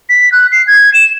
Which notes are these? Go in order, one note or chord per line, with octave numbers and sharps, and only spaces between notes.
B6
F#6
C7
G#6
E7